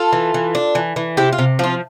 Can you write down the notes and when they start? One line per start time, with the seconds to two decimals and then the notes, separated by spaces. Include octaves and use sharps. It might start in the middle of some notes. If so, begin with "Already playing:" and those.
Already playing: F4 A4
0.13 E3
0.34 E3
0.55 D4
0.75 E3
0.96 E3
1.17 C3 E4 G4
1.33 F4
1.38 C3
1.59 F3 F4